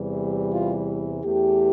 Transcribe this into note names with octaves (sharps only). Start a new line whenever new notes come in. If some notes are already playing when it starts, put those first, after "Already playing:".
Already playing: E2 C3 E3 G3
F4
E2 E3 A3 G4